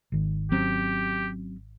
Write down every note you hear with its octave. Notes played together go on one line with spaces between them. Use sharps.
G#1 D#3
F#3 C4 C#4 G4